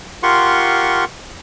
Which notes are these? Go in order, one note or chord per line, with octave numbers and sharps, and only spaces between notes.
F4 G4 A#4 F#5 C6 C#6